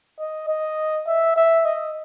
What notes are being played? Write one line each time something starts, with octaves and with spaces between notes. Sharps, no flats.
D#5
D#5
E5
E5
D#5